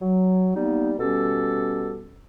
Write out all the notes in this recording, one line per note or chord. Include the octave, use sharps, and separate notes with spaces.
F#3
G3 A#3 B3 D#4
B2 G3 C#4 G4 A4